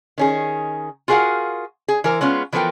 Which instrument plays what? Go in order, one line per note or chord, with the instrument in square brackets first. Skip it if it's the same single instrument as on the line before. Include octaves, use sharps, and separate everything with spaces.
[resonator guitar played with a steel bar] D#3 C#4 G#4
F4 F#4 G#4 A#4 F5 F#5
G#4
E3 A#4 C5
G#3 B3 C#4 F4
E3 F3 B3 A4 A#4 G5